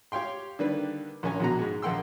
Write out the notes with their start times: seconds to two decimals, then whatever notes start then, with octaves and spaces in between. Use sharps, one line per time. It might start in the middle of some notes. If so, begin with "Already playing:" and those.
0.12 G4 C#5 F5 G5 C6
0.59 D3 D#3 G3 A#3 D4 B4
1.23 A#1 A#3 C#4 C#5 G#5
1.40 A#1 B2 F#4 A#5
1.59 G#2 G#3
1.82 A#1 A#3 F#5 G5 C6 E6